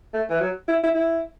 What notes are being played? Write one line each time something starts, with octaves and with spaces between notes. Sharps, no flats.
A3
E3
F#3
E4
E4
E4